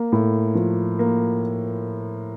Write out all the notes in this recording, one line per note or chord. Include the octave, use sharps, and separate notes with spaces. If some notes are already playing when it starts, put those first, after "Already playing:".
Already playing: A#3
A2
F3
A#3